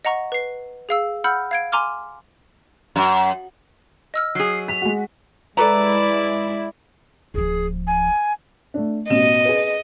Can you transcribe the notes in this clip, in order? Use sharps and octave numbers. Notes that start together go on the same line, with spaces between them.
D#5 F#5 A#5 C#6
B4 C7
G#4 F5 E6
F#5 B5 E6 F6 G6
F5 G#6 D7
G#5 A#5 C6 D6 F6
F#2
D#5 E6 F6
F#3 G#4 C7
B6 F7
G#3 F#4
G#3 E4 A4 B4 D5 A#5
D1 F3 G#4
G#5
A3 D4
A1 B2 D#5 E7
G#4 B4